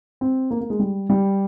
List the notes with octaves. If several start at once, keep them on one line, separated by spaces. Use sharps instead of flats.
C4
A#3
A#3
G#3
G3
G3